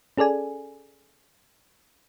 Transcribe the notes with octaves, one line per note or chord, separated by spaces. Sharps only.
C#4 G#4 A4 D5 G#5